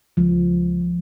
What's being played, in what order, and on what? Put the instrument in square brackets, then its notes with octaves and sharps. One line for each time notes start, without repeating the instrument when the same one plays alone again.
[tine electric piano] C#2 [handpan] F3